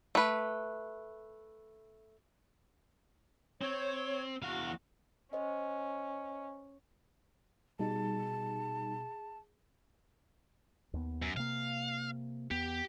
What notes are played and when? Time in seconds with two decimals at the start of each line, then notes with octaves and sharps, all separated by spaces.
0.15 A3 B4
3.61 C4 C#5
4.42 E2 F#4 F5
5.33 C#4 C5 D#5
7.79 B2 G3 D#4 G#4 A5
10.94 D#2 B3
11.22 F#2
11.37 C3 A#3 F5
12.51 E2 B3 G4